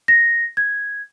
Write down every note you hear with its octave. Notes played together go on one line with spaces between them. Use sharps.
A#6
G#6